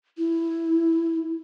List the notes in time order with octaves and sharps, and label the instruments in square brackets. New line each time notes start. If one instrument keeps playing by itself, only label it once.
[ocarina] E4